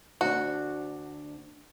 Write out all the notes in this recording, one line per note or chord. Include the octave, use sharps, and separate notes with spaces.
D2 D4 F#4